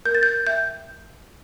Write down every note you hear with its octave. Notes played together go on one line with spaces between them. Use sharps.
A#4 G6
A6
G6
E5 G5 G6